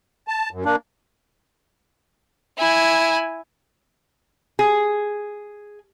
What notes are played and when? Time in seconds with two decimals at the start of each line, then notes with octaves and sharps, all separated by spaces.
0.28 A5
0.52 F#2
0.65 A#3 D4
2.58 E4 G#5
4.59 G#4